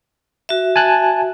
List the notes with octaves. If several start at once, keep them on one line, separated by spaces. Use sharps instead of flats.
F#4 E5
G#5 A5 F#6